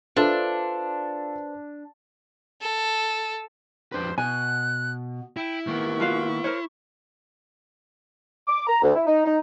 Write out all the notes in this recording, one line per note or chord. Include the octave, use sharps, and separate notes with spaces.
D4 F4 A4 B4 C5 E5 C6
A4
F2 D4 B4 C5
B2 G#5 F#6
E4 G5
D#3 A#3 B3 C#6
F4 F#4 F5
A#4 C5 C#5
D6
A#5
D2
E4
D#4
D#4